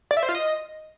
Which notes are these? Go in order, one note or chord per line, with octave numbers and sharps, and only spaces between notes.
D5
E5
C5
F4
D#5